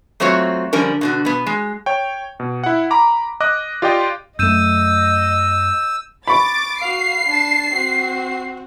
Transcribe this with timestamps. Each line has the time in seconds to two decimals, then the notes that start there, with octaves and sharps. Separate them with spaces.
0.20 F#3 A3 C4 F4 F#4 C#5
0.73 D3 F3 G3 C#4 A#4
1.01 B2 D3 F#4
1.25 B2 B3
1.47 G#3
1.86 C#5 G5
2.40 B2
2.64 E4 F#5
2.91 A#5 B5 D6
3.40 D#5 D6 F#6
3.82 F4 G4 D5 D#5 G5
4.39 F#2 A3 D#5 E6 G6 D#7 E7
6.27 B5 C#6 D6 A6
6.81 F#4 F5 C7
7.26 D4 A5
7.73 C4 F#4